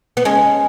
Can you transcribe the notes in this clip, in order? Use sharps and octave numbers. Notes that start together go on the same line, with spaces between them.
B3
G#3 C#4